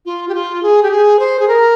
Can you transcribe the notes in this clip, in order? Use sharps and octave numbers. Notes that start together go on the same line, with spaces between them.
F4
G4
F4
G#4
G4
G#4
C5
G#4
A#4